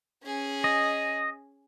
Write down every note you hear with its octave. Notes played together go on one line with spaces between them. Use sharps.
C#4 G#4
D#5